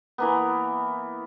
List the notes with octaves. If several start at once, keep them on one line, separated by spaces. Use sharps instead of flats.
E3 A#3 B3